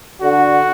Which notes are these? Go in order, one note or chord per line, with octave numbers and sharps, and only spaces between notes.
D3 F#4